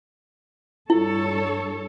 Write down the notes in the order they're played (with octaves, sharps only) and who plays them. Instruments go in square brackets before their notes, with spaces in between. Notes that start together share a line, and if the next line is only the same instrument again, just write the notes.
[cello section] G2 A4 C#5 [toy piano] E4